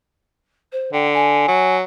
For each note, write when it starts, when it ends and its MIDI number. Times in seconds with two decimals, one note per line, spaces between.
0.72 0.93 72
0.93 1.44 50
0.93 1.06 79
1.14 1.75 80
1.48 1.83 54